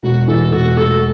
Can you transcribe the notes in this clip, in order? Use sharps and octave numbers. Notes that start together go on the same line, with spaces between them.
E1 F#4
E3 A4
E1 F#4
A3 A4